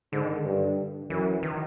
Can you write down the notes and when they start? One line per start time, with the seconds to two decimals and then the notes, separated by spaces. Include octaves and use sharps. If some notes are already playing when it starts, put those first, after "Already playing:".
0.13 G#2 D3
0.25 D#3
0.38 D3
0.45 G2
1.10 F#2 E3
1.43 D#3